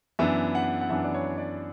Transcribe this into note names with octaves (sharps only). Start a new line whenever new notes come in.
F#2 E3 B3 D4 E5
F#5
F#5
F#2 E3 B3 D4 E5
D5
C#5
D5